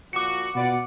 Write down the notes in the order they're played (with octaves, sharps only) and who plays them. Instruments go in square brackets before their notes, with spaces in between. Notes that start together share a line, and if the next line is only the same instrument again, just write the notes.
[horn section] A#2 F3 F#4 [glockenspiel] D6 C#7
[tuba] B2 [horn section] F4 B4 D5 [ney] F#5